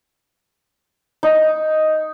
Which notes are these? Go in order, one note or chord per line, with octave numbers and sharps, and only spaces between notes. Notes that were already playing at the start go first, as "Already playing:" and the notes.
D#4